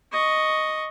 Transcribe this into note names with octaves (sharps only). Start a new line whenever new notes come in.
D#5 C#6